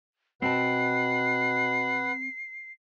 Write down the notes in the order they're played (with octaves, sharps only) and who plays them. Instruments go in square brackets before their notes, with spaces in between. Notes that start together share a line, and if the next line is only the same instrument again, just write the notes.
[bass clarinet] B2 [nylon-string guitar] C4 A5 [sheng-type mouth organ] B4 F#5 [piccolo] C7